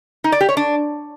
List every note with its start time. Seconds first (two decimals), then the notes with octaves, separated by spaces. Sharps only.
0.24 D#4
0.32 D5
0.41 G4
0.49 C#5
0.57 D4